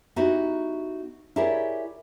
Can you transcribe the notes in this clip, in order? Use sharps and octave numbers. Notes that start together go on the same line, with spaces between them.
B3 D#4 E4 F#4 G4
E4 G4 G#4 A#4 C#5 D5